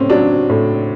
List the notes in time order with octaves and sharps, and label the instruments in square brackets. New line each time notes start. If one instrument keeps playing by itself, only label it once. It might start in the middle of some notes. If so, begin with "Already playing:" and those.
Already playing: [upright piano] A2 C4 C#4
F#3 D4
A2